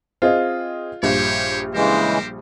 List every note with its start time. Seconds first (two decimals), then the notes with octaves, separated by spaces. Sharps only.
0.22 C4 F4 G#4 D#5
1.03 A#1 G2 G4 C5 C#5
1.74 C#3 E3 G#3 G4 A#4 C5